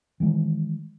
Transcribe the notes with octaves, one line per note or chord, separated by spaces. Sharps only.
D#3 E3 G#3